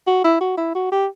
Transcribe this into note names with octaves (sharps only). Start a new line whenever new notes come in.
F#4
E4
F#4
E4
F#4
G4